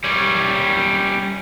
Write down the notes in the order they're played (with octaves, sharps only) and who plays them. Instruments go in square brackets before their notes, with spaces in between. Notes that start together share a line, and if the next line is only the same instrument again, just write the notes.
[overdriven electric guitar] G3 C#4